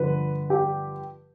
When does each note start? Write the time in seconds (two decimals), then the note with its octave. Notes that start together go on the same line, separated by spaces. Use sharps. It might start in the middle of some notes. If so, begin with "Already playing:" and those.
Already playing: G2 D3 F3 B4
0.50 G4